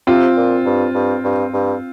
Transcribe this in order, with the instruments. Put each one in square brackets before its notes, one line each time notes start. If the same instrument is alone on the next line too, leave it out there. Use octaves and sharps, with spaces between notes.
[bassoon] C3 [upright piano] C4 F4
[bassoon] A#2
G2
G2
G2
G2